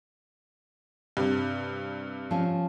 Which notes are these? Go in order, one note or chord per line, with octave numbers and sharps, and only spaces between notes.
G2 C3
F3 C#4